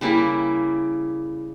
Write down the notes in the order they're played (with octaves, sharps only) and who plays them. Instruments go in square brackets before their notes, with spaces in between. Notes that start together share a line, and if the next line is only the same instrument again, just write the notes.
[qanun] C#3 G3 A#3 E4